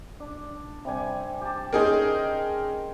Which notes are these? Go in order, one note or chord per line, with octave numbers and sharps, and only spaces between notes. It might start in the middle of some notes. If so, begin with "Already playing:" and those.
D4
C3 G3 G#5
G4 A5
C#4 D#4 G#4 A#4 C5